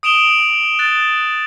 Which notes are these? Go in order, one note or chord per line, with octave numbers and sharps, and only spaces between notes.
D#6 D7 E7 F7 G7
F#6 A6